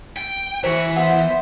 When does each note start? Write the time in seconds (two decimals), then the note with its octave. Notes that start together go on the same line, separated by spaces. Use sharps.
0.17 G5
0.64 E3 F#4 C5 C#6
0.96 B3 C5 E5 F#5